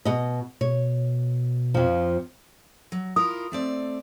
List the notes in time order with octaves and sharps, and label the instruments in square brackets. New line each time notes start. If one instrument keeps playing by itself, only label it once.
[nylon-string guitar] B2 D#5
[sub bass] B2 [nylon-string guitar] C#5
[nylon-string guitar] F2 F3
[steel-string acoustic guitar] F#3
[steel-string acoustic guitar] E4 F4 A#4 [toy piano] D#6
[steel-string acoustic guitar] A3 C4 D5